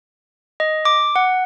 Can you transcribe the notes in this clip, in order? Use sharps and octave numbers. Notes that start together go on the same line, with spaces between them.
D#5
D6
F#5